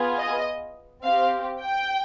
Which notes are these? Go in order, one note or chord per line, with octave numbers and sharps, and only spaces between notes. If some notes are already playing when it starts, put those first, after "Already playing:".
Already playing: B3 F4 G#4
D#5
C4 G4 F5
G5